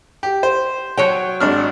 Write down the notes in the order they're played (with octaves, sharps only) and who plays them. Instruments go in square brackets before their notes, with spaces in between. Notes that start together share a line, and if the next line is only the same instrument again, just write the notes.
[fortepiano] G4
C5
[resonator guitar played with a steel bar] F#3 C#5 G5
[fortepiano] G#1 D4 F6